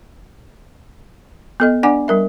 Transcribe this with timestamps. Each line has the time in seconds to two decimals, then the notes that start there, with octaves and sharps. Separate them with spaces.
1.60 B3 A4 D#5
1.83 D4 D5 F#5 G#5 D6
2.08 G3 A#4 E5